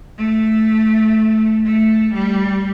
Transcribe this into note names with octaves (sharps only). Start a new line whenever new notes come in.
A3
A3
G3